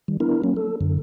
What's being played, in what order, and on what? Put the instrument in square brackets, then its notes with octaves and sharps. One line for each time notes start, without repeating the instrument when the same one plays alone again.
[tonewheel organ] D#3 G3
B3 D4 E4 A#4
F#3 A#3 C#4
A4
F#2 D3